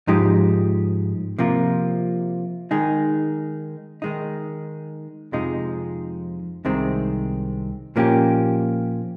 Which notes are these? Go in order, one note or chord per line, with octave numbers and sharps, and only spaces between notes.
G#2 F3 G#3 D#4 G4
C3 F3 A#3 F4
D#3 G#3 D#4 G#4
D#3 G#3 D#4
F2 C3 F3 G#3 D#4
C2 C3 D#3 G#3 C4
A#2 F3 A#3 C#4 G4